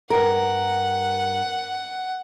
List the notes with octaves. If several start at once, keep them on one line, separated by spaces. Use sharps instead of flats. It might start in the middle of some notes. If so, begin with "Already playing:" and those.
G2 A#4 F#5